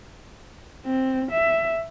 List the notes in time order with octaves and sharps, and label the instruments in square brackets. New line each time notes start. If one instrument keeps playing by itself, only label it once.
[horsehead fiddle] C4
E5